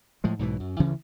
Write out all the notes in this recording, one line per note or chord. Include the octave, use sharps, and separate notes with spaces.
A2 F3 G#3
B1 G#2 B2 E3
F#2
D2 C#3 E3 C#4